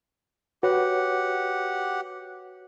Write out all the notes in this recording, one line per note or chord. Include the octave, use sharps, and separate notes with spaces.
F#4 G4 B4 C#5 F#5